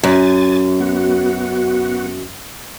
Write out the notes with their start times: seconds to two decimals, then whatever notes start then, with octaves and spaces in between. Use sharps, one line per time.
0.03 F#2 G#5 A6
0.80 B3 F#4